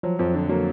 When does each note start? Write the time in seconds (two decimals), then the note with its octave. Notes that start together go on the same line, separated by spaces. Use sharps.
0.03 F3 F#3
0.19 F2 F3
0.34 D3
0.49 F#3 A#3